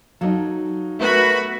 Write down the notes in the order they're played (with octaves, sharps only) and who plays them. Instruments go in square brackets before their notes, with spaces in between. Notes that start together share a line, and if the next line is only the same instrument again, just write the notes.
[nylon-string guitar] F#3 A4 [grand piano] D#4 F5
[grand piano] A3 B3 A#4 [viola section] F#4 B5